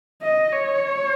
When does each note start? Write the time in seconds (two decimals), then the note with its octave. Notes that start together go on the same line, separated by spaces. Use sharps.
0.22 D#5
0.53 C#5